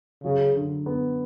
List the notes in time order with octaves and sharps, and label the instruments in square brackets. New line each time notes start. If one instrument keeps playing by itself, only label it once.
[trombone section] C#3 [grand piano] F#3
[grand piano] D3
B3